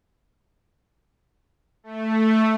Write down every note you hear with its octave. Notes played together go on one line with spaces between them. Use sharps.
A3